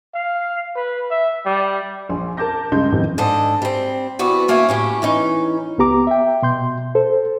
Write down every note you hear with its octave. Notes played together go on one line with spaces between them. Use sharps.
F5
B4
E5
G3
A#1 G#5 C6
A#4 A5 D6 G6 A#6
C#2 G2 C#3 G#3 C6 G6
F2 A2 D#3 E3 G3
G#2 D4 A4 D#5
G3 C4
C3 E3 B3 F#4 D5
D2 A#3 C#4 C#5 E5 G#5
A2 C#4 G4
E3 C#4 D#4
C#2 B3 G4 A#5 D6
E5 G5
B2 C6 G6
A4 C5